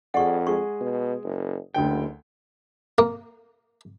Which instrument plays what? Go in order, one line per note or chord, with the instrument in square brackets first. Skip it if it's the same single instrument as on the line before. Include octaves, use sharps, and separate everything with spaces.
[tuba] F2 [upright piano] G#4 D5 [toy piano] F#5 C#6
[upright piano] G#3 G#4 [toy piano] C#6
[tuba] B2
F#1
[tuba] F#1 [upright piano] D2 D3 G5
[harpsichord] A#3